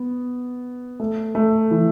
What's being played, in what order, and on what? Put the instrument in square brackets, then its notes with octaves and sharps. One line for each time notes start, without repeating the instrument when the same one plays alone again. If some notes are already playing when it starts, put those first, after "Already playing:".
Already playing: [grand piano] B3
A3
A3
E3